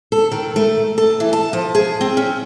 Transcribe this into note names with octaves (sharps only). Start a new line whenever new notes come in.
A4
D#3
A3
A4
E3
A5
F3
G#4
C4
C#4